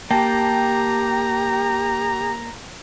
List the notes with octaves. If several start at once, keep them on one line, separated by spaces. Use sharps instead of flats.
A#3 G4 G5 A5 A#5